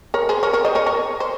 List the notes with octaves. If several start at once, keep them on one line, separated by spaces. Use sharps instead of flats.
A#4 C#5
G#4 C5
A#4 C#5
A#4 C#5
C5 D#5
A#4 C#5
A#4 C#5
C5